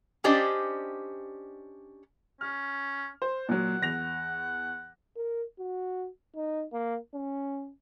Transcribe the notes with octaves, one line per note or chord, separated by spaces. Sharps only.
C#4 D4 G4 C5 D5 D#5
C#4 F6
C5
A#2 F#3 F#5
E2 A#6 F7
A#4
F#4
D#4
A#3
C#4